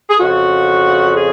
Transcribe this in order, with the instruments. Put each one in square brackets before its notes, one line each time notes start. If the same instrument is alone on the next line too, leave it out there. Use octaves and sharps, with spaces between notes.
[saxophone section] G#4
F2 C#3 F#4
G#4